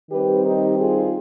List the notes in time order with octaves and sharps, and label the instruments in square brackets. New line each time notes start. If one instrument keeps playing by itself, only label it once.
[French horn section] D#3 G3 C4 G4 B4
D#4 G4
F4 G#4